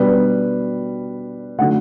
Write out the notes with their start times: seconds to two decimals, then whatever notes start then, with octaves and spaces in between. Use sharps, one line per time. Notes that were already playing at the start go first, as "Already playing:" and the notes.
Already playing: B2 G3 D4 B4
1.59 D3 F#3 A3 F#5